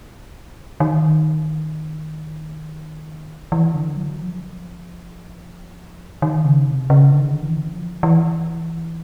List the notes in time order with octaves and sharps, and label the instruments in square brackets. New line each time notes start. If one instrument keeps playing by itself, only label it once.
[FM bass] D#3
E3
D3
F#3
F3
D#3
C#3
C3
C#3
D3
D#3
D3
E3
F3
E3